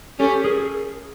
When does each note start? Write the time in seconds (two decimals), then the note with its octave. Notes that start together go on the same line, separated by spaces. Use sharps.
0.19 C#4 G4 A4
0.44 G#4 A#4